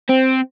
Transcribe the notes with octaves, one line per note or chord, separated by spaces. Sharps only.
C4